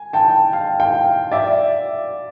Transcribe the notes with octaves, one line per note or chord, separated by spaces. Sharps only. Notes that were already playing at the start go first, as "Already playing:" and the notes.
Already playing: G#5
G5 A5
F5 G5
F5 G5
D5 E5